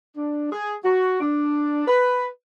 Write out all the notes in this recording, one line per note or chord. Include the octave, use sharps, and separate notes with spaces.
D4
G#4
F#4
D4
B4